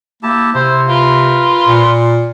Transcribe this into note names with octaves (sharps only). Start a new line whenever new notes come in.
A#3 E4 G4 A5
C3 E4 C5
F4 A#4 B4
A#2